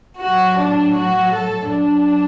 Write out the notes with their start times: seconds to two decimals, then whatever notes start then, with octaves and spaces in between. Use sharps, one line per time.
0.21 A2 F#3 F#4
0.59 D4
0.96 F#4
1.33 A4
1.70 F#2 F#3 D4